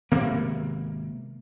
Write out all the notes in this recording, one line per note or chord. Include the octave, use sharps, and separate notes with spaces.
G#1 C3 A#3 B3